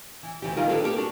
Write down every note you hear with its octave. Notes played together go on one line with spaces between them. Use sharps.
E3
D2 E3 G4
D#3 G3 D#4 F4 G4 A#4
D4 E4 G4 A4 B4
B3 G4 A4 A#4
D4 F#4